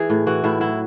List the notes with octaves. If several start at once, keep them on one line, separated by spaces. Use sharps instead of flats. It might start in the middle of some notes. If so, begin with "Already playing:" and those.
Already playing: E3 G#4
A2
E3 F#4
A2 E4
F#3 E4